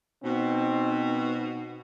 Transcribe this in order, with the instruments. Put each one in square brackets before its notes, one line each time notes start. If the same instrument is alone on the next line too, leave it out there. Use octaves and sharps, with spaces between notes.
[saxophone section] B2 [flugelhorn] C4 [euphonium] D#4